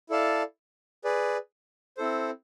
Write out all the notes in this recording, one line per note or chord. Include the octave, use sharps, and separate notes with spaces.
E4 A4 D5 F5 A5
G#4 B4 D5
C4 E4 A4 C5